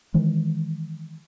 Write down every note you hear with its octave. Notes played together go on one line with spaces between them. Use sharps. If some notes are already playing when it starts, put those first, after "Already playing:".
D#3 E3 G#3